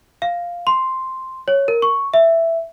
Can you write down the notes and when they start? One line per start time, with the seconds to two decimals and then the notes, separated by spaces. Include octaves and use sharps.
0.22 F5
0.67 C6
1.48 C#5
1.68 A#4
1.82 C#6
2.14 E5